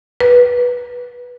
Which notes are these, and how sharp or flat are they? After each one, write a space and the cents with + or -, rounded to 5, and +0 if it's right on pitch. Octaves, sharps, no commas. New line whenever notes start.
B4 -15